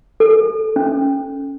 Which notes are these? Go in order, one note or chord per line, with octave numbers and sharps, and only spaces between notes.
A4
C#4